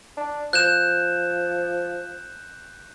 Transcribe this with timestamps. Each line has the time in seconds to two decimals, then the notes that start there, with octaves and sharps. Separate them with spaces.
0.17 D4
0.53 F3 F#6 G6 E7